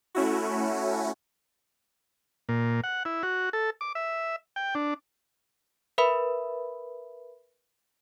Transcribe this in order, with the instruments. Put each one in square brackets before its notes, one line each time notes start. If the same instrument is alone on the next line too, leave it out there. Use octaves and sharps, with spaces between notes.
[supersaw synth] A3 C#4 E4 F#4
[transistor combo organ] A#2
F#5
E4
F#4
A4
D6
E5
G5
D4
[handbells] A#4 B4 E5 B5